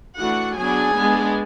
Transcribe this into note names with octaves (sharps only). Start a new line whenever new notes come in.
E3 A3 D4 F#4 F#5
F#3 B3 D4 G#4 G#5
G#3 B3 D4